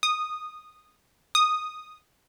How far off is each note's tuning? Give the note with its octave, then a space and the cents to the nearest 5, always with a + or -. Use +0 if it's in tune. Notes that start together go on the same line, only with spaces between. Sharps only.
D#6 -10
D#6 -5